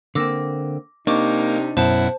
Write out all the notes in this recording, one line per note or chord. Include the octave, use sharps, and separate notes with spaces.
D3 A#3 C4 D6 E6 A#6
C3 A#3 D4 D#4 C#6 D6
F#2 B2 E4 C5 F#5 A5 E7